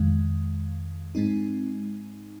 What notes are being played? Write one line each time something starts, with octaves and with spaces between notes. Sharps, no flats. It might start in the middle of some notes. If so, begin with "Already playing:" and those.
Already playing: F2 D#3 G#3
G#2 G#3 C4 D#4